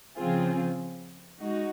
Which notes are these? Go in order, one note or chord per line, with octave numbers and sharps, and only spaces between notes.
C#3 F3 C4 F4 G#4
G#3 D#4 F#4